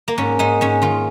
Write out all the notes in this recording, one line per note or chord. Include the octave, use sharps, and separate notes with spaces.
A#3
G#2 C#4
G#2 D#4
G#2 C#4
D#3 F4